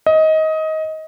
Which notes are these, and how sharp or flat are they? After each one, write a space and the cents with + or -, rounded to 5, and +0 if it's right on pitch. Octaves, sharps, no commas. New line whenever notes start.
D#5 +20